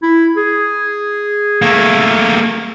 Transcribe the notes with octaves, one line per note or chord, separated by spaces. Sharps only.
E4
G#4
A3 A#3